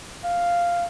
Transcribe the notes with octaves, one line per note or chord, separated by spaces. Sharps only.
F5